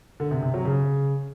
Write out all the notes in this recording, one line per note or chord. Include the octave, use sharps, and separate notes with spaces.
D3
C3
C3
F#3
C#3